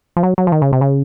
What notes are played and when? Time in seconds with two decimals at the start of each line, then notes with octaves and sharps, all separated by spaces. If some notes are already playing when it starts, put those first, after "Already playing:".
0.17 F3
0.23 F#3
0.38 F#3
0.47 F3
0.52 D#3
0.62 C#3
0.72 C3
0.81 C#3